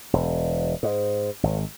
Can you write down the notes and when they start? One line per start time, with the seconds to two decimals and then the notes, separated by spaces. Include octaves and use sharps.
0.13 E1
0.83 G#2
1.43 G#1